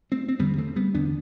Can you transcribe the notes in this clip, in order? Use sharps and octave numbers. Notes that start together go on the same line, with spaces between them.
A3 C4
C4
E2 D3 G3 B3
A3 C4
G3 B3
E2 D3 B3 D4